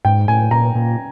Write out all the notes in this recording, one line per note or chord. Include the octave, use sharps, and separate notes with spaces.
G#2 G5
A2 G#5
A#2 A#5
A#2